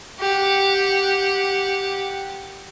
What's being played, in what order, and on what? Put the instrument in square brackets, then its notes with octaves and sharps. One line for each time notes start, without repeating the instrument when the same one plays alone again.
[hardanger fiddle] G4 F#5